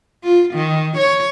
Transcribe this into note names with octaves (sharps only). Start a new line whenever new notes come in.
F4
D#3
C#5